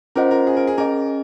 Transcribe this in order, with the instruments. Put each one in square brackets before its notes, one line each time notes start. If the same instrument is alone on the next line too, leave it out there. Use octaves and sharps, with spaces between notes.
[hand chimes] C#4 F4 C5 D#5 F#5 [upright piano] A#4
[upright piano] A#4
G#4
A#4
G#4
[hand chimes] C#4 G#4 D#5 [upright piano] A#4